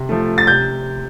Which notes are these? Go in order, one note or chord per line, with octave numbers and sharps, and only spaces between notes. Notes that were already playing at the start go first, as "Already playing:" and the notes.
Already playing: C3
F3 A3
A6
C3 G6